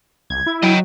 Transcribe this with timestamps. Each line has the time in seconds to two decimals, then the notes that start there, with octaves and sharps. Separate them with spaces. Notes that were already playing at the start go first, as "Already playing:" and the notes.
0.30 C2 G#6
0.46 E4
0.63 F#3 D#5 G5